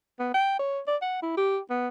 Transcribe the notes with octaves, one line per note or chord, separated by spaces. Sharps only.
B3
G5
C#5
D5
F#5
E4
G4
B3